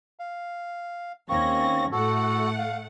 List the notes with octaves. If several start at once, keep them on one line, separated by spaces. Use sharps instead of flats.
F5
D#2 A#3 C4 C#4 C#6 A#6
A2 A3 F#4 A4 F#5
F5